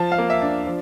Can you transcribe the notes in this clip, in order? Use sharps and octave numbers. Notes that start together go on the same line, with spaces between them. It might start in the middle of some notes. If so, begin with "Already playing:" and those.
Already playing: F3 A5
F5
A#3
E5
D4
F3